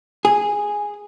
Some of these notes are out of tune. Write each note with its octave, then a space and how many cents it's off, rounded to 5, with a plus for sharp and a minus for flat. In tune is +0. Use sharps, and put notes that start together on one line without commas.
G#4 -5